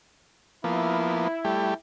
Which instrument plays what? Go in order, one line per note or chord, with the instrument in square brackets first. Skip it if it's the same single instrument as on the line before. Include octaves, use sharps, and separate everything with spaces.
[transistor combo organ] F3 A#3 B3 [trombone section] E4
[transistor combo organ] G3 A3 G4